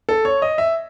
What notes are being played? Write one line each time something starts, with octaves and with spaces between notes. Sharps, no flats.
A4
C#5
D#5
E5